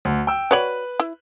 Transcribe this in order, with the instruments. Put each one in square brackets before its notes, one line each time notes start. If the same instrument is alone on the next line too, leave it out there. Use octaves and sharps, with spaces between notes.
[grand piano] D2
G5 E6
[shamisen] F#4 C#5 D5 [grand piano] B4 F#7
[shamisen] E4